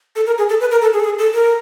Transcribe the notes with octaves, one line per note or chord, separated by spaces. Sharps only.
A4
A#4
G#4
A4
B4
A#4
A4
G#4
A4
G#4
A4
A#4